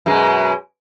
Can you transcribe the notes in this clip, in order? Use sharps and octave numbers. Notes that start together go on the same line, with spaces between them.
F#2 B2 G#3